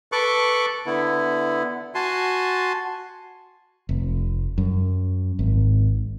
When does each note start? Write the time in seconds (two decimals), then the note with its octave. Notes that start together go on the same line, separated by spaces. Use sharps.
0.12 A4 B4 C#6 D6 F#6
0.86 D3 B3 E4
1.95 F#4 G#5 A5 C6
3.89 F1
4.58 F#2
5.39 G#1